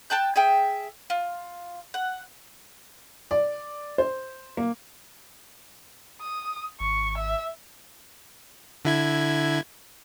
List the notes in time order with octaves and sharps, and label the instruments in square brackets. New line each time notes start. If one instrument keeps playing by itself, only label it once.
[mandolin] G5 A5 F#6 G6
G#4 E5 G5
F4
F#5
[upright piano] D5
C5
A#3
[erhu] D#6
[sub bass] G#1 [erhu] C#6
[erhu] E5
[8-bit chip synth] D3 E4 G#6